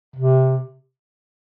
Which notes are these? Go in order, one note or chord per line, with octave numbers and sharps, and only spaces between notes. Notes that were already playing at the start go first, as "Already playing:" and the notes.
C3